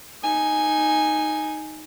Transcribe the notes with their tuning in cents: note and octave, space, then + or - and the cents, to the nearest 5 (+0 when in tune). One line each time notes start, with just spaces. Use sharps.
D#4 +0 G#5 +0